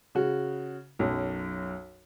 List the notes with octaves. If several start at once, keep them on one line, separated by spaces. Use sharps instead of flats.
C#3 F#4
B1 F#2